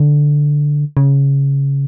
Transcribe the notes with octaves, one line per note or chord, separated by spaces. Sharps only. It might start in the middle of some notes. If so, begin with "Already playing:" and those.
Already playing: D3
C#3